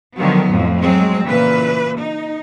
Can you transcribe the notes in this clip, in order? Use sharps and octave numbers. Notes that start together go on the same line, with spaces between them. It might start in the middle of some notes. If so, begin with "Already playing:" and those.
D3 D#3 F3 F#3 B3
F2 A2 F3
F#3 G#3 C4
A#2 C#3 E3 B4
D#4